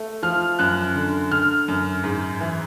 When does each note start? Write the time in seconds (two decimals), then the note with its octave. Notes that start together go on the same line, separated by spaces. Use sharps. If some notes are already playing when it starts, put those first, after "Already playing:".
Already playing: A3
0.23 F3 F6
0.59 F#2 F#6
0.95 D3
1.31 D3 F6
1.68 F#2
2.04 G#2
2.40 E3